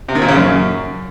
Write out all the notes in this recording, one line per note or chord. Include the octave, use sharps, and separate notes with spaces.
C3
D#3
A#2
C#3
F#2